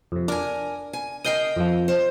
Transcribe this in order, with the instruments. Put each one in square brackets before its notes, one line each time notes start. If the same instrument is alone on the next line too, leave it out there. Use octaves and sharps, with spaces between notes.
[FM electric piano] F2 C3
[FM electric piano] D4 [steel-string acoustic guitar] A#4 G#5
[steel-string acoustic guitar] G#5
[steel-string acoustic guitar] A#4 D#5 G5 [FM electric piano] D#6 G6 C7
[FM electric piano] F2 F3
[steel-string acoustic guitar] C5